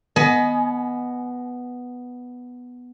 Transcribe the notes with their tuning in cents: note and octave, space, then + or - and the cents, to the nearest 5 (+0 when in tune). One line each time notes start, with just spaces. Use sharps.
B3 +0 D#5 +0 G#5 +30